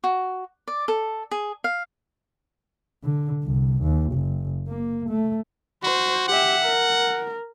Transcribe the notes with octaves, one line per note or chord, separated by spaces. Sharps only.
F#4
D5
A4
G#4
F5
D3
C2
D#2
F#1
A#3
A3
F#4 C5
G4 E5 F#5
A#4